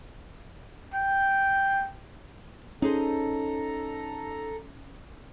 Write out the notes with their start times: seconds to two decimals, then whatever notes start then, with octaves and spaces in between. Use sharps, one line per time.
0.94 G5
2.82 C#4 D#4 G#4 A4 C5 A#5